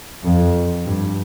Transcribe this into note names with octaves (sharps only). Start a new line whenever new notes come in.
F2
G2